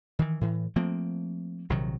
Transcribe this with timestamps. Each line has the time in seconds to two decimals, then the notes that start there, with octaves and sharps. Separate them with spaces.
0.19 D#3 E3
0.41 A2 E3
0.76 F3 A3 A#3 C4
1.70 A#1 C3 D#3 F#3